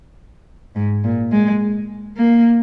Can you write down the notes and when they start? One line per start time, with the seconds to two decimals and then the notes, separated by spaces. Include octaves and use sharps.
0.76 G#2
1.04 A#2
1.32 G#3
2.17 A#3